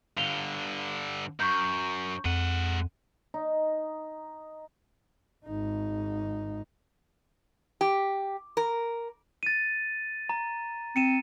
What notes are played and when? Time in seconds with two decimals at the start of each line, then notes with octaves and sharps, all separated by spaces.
0.17 G2 D3 F5 F7 G7
1.40 F#2 C#6 G6
2.25 F2 G#3 F#5 D#7
3.34 D#4
5.46 G#1 D#4
7.81 G4
8.57 A#4
9.43 A6 D#7
10.29 A#5
10.96 C4 C#7 D#7 E7